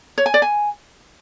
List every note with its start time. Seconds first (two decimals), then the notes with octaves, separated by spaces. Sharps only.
0.18 C#5
0.26 G#5
0.34 D5
0.42 G#5